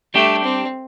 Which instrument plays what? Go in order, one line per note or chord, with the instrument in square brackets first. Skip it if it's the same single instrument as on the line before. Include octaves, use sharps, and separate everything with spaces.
[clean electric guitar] G3 D4 G4 [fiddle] A3
[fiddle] C4